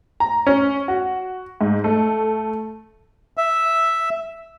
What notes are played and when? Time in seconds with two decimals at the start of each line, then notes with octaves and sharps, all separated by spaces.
0.20 A#5
0.47 C#4
0.88 F#4
1.61 G#2
1.84 A3
3.37 E5